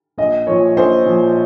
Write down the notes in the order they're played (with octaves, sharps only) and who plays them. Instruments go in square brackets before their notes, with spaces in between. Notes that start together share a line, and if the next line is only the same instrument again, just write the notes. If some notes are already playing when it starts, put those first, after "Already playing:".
[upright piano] A#1 D#5
A#2 F3 C#5
A#1 C5
A#2 F3